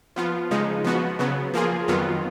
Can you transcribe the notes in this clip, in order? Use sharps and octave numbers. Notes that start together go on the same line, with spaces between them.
F3 B3 F4
C#3 F3 G#3 D#4
F3 B3 F#4
C#3 F#3 B3
F3 A#3 F4 G#4
F2 D#3 F#3 B3 F4